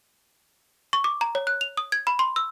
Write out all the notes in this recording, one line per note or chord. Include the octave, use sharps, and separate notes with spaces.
C#6
D6
A#5
C#5
F#6
F7
D#6
G#6
B5
C6
E6